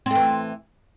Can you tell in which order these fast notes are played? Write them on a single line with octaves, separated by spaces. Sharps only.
C4 A3 E3